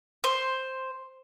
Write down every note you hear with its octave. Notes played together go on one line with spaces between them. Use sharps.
C5